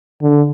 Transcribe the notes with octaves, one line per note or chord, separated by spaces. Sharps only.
D3